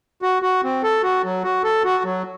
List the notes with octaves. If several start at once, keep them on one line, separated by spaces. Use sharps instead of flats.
F#4
F#4
C4
A4
F#4
F#3
F#4
A4
F#4
F#3